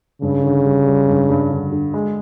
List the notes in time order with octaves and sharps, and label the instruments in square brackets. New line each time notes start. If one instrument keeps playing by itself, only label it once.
[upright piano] G2 [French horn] C#3
[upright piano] D3
G3
G3
G2
G2
D3
D3
G#3